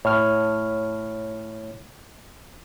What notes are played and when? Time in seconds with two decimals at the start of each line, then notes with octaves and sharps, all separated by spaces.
0.05 A2 C#5 F6